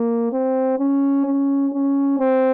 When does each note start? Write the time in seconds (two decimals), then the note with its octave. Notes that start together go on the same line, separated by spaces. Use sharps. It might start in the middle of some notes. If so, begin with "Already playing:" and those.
Already playing: A#3
0.33 C4
0.79 C#4
1.26 C#4
1.73 C#4
2.19 C4